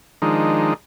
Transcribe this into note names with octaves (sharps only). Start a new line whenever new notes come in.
D#3 F3 G#3 D4 D#4